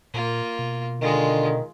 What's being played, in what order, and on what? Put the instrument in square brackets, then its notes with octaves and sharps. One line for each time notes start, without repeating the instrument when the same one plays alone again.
[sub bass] A#2 [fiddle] A#3 F4
[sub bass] B2
[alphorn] D3 [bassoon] D#3 [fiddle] G#3 F4